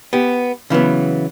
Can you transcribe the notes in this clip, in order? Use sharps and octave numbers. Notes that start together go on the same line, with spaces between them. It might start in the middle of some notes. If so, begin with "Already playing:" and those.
B3 G4
C#3 E3 F#3 B3